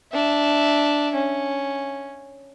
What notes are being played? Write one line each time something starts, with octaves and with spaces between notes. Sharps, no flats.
D4 E5
C#4